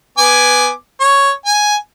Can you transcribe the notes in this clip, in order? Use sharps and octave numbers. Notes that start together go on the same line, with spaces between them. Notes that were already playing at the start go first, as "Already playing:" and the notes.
B3 G#5 D6
C#5
G#5